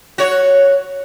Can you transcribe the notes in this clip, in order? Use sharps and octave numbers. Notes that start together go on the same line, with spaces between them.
F#4 C#5